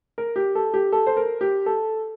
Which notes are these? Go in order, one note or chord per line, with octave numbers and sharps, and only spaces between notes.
A#4
G4
A4
G4
A4
C5
A#4
G4
A4